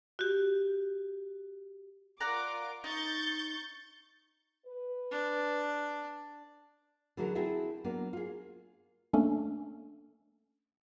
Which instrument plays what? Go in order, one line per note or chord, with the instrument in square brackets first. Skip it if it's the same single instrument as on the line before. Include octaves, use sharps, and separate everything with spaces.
[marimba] F#4 G4
[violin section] F4 A#4 D6 [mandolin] D5 F#5 A#5
[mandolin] D#4 [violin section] C#6 G6 A6
[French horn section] B4
[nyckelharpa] D4
[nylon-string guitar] D3 E3 F#3 A3 G#4 A#4
C4 E4 F#4 G#4 A4 E5
F#3 A#3 B3 D4
F4 G#4
[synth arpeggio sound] A3 A#3 C#4 D4 A4